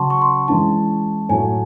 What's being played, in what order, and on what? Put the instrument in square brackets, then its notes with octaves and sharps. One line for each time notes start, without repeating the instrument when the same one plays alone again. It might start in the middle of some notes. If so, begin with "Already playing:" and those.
Already playing: [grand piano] C#3 F#3 C#4 [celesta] F#5 A5 C6 C#6
[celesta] C#6
C6
[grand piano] E3 G#3 C#4 E4 [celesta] A5
[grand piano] A2 F#3 A3 [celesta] G#5